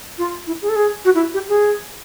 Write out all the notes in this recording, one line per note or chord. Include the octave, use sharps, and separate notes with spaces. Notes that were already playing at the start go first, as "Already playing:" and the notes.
F4
E4
G#4
A4
G#4
F#4
E4
G4
G#4